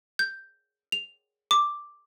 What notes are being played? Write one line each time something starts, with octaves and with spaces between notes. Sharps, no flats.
G6
F7
D6